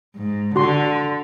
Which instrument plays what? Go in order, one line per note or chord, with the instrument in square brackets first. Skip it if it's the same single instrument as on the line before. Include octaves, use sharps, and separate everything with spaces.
[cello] G#2
[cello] D3 [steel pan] F#4 C6